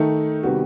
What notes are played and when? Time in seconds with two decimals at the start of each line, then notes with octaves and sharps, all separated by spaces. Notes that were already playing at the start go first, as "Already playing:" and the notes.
Already playing: D#3 A3 D#4 A4
0.43 C3 D#3 G3 B3 F#4